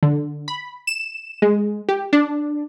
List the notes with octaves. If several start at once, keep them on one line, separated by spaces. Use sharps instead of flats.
D3
B5
E7
G#3
G4
D4